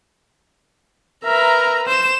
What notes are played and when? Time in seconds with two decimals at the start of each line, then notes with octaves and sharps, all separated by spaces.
1.25 A#4 B4 E5 A#5
1.88 C5 E7